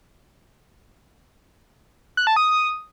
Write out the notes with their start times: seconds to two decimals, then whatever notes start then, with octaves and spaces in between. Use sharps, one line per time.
2.17 F#6
2.27 A5
2.36 D#6